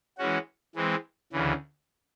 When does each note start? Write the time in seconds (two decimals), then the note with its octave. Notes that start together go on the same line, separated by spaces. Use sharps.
0.18 E3 G#3 C#4 F#4
0.75 E3 G#3 C4
1.33 D2 C#3 E3